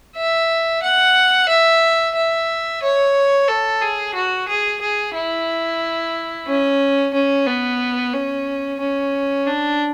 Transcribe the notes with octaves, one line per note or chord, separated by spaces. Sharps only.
E5
F#5
E5
E5
C#5
A4
G#4
F#4
G#4
G#4
E4
C#4
C#4
B3
C#4
C#4
D4